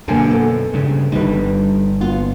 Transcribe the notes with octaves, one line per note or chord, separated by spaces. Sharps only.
F#2 B2 D3 A#3 G#5
A4
G2 C#3
G1 D3 G3 D#4 B4
B3 F4